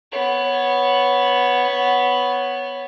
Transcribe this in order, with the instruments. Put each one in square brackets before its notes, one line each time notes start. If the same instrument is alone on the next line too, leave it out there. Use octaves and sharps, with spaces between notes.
[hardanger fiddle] B3 C#5